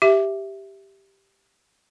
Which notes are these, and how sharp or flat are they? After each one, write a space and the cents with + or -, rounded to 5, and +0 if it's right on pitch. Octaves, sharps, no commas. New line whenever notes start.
G4 +0 E5 +0